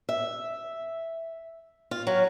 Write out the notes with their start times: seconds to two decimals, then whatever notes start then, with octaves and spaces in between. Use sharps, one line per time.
0.09 E5
1.91 F4
2.07 F#3